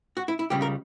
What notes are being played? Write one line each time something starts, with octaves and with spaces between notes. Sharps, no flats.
F#4
E4
E4
C#2 C#3 G3 G4
A#4